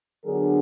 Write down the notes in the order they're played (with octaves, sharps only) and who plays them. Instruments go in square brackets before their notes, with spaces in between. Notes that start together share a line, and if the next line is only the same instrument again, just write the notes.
[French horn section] D3 F#3 B3 D4 G#4 A#4